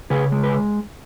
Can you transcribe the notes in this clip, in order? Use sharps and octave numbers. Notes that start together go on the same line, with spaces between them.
C#3 G#4 B4
G#3
B4